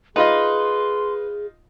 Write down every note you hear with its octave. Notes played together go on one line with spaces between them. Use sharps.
D#4 F4 G#4 B4 D#5 C6